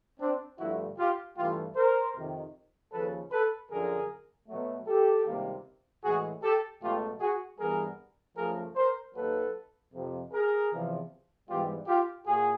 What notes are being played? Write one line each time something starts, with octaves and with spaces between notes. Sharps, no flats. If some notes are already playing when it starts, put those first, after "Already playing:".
C4 D4
G2 D3 F3 A3 E4 F#4
F4 G4
G2 E3 A3 F4 G4
A#4 C5
F2 C3 D#3
D#2 C#3 F3 A4 B4
A4 B4
F#2 D3 F3 G#4 A#4
B2 F#3 A3
G4 A4
C#2 C3 D#3 G3 A#3
A2 E3 G#3 F#4 G#4
G4 A4
C#2 B2 F#3 A3 F4 G4
F#4 G#4
G2 E3 G3 B3 G#4 A#4
F#2 C#3 F3 A3 G#4 A#4
A#4 C5
D#2 D#3 F#3 A#3 A4 B4
F2 C3 F3
G#4 A#4
E2 C3 F3
G#2 E3 G3 B3 F4 G4
F4 G4
A#2 F#4 G#4